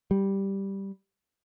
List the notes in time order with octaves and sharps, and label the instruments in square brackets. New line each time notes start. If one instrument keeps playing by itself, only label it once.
[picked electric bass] G3